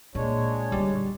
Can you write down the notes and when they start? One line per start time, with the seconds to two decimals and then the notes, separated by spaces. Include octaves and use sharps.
0.15 A#2 G#3 D4 C#5
0.72 D#2 D3 G3